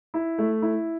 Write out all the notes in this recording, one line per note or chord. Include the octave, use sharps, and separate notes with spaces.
E4
A3
E4